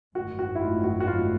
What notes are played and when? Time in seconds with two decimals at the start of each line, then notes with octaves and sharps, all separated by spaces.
0.15 G#1 F#2 D#3 F#3 A3 F#4
0.39 F#4
0.55 E4
0.61 F4
0.84 F#4
1.00 F#4
1.07 F4